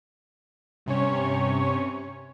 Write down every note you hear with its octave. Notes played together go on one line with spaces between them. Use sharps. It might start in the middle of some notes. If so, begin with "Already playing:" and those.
G2 C3 C#4 C#5